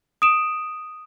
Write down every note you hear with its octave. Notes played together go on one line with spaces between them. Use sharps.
D#6 D7 E7